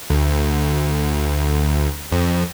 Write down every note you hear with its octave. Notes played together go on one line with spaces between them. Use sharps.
D2
F2